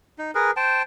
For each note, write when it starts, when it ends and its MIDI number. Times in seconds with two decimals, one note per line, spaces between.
0.18 0.31 63
0.35 0.51 68
0.35 0.51 70
0.35 0.51 71
0.57 0.82 72
0.57 0.82 79
0.57 0.82 81